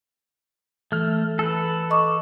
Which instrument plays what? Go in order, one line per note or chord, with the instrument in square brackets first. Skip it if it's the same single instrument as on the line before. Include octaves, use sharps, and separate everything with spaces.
[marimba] E3 [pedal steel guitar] A3 F6
[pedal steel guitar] A4 B4
[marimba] D#5 C#6 D6